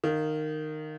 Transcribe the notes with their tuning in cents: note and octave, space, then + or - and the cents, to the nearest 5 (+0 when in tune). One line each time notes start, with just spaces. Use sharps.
D#3 -15 F5 +0